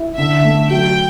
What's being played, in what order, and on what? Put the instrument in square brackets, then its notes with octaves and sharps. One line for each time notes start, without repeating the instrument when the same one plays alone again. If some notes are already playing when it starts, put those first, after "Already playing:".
Already playing: [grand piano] E4
[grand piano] D3 [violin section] E5
[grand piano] A3
[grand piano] F#3 [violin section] G5